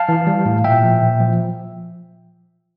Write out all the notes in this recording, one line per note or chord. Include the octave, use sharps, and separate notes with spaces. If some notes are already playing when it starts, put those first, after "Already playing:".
Already playing: F5 A5
E3
G3
A2
A#2 E5 G5
F3
A#2
F3